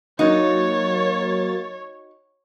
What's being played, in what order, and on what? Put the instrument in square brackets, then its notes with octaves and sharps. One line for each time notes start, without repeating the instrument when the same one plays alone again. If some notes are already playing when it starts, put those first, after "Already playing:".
[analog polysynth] F#3 A#3 A6 [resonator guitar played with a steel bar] D#4 F#4 [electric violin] C#5